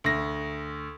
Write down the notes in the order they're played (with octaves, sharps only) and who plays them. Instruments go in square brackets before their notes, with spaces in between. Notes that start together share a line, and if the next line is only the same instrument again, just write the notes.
[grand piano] D2 A#6